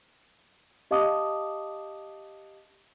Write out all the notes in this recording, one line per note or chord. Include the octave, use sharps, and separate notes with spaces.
G4 D#5 F5 A5 D6 D#6